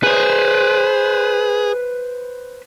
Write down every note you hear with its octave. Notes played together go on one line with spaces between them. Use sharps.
G#4 B4 C5